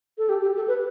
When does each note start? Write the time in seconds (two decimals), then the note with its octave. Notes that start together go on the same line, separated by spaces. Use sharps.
0.18 A4
0.29 G4
0.42 G4
0.56 A4
0.68 B4